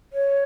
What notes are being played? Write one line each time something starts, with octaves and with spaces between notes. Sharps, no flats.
C#5